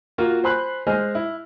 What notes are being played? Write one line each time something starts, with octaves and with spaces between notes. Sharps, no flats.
A#3 F4 F#4 A#4
C5 G#5 B5 C6 F#6
G#3 G#4 C5 D#5 G#5 F6
E4